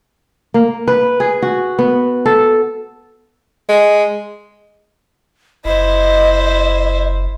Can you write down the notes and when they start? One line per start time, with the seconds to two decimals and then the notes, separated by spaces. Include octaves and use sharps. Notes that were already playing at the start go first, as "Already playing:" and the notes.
0.54 A#3
0.88 B4
1.20 G#4
1.42 F#4
1.79 B3
2.26 A4
3.69 G#3
5.65 F#1 E4 C5 D#5